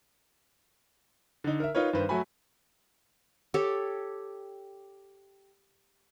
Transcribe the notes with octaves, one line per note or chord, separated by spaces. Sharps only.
D3 D#4
A#4 E5
D#4 F4 A#4 B4 C#5
G2 D#3 B4 C5
F#3 A3 F#4 G#5 B5
G4 A4 C#5